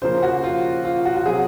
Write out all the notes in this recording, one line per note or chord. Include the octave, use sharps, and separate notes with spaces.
C#3 F3 A#3 C5
F#4
F4
F4
F#4
F#4
C3 F#3 C4 G#4